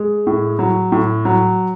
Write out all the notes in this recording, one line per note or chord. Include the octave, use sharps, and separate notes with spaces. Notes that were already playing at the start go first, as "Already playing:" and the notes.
Already playing: G#3
A2
F#3
A2
F#3